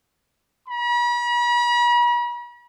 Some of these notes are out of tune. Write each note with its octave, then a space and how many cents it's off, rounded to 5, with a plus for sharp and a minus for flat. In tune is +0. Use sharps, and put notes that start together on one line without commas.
B5 -45